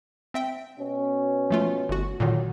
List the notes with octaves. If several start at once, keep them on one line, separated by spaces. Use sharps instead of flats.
C4 E5 G5
B2 C#4
F3 A3 F4
G1 F#4
A#2 D3 D#3 F#3